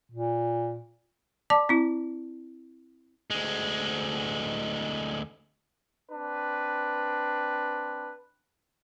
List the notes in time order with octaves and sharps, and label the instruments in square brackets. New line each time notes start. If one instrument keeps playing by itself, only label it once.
[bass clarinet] A#2
[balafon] D5 A5 D6
C4 E4
[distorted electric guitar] D2 G#3
[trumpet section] C4 D4 B4